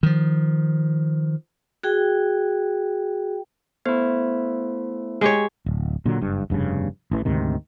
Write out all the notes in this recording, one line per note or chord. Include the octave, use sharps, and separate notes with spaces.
D#3 F3
F#4 G#4 G5
A3 B3 E4 C5
G#3 G4 C#5
D1
A#2 D3 F#3
F#1 G2
F1 G2 A#2 C#3
A1 E3
D2 G#2 C3 D#3